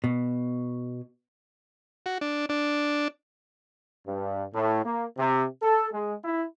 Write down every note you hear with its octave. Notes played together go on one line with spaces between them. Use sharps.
B2
F#4
D4
D4
G2
A2
A#3
C3
A4
G#3
E4